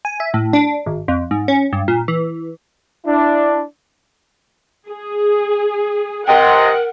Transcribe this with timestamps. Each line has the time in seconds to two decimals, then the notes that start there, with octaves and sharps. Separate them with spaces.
0.05 G#5
0.20 E5
0.34 A2
0.53 D4
0.86 G#1
1.08 F2
1.31 G#2
1.48 C#4
1.73 G2
1.88 A#2
2.08 E3
3.05 D4 E4
4.90 G#4
6.28 C3 A#4 D#5 F#5 G5